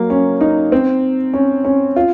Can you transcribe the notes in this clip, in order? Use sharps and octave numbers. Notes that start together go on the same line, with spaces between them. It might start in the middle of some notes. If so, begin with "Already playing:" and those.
Already playing: F#3 A#3
C#4
D#4
C4
C#4
C#4
F4